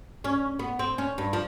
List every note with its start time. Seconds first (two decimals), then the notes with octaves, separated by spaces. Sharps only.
0.24 C#4
0.59 B3
0.79 C4
0.98 C#4
1.18 G2
1.33 F3